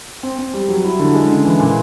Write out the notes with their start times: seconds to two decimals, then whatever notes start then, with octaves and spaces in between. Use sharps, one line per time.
0.23 C4
0.39 C4
0.54 G3
0.69 F#3
0.84 E4
0.99 D3
1.14 G#3
1.30 C#3
1.45 E3
1.60 A#2